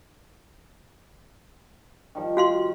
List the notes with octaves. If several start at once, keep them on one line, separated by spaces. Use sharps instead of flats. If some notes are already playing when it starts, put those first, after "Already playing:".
D#3 F3 G3
F#4 F5 C6